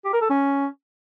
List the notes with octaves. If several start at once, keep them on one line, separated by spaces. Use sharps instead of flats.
G4
A#4
A4
C#4